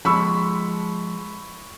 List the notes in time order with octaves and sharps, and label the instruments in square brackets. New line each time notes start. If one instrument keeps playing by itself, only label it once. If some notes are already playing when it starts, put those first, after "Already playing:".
[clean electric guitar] F3 G#3 [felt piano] B5 C#6 E6